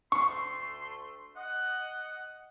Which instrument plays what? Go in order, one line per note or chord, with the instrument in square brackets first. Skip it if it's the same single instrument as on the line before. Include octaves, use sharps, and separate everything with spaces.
[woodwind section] D2 A3 C6 [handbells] C#6
[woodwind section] D#5 F#5